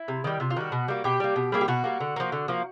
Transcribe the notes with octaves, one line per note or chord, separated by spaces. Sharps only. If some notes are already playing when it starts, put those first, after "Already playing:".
Already playing: E4
C3
D#3 G3
C3 F4
F4
D#3 G3 F#4
B2
G3 A#3
B2 G4
G3 A#3
B2
G3 A#3 G#4
G4
B2 F#4
G3 A#3
D3
F3 A#3
D3
F3 A#3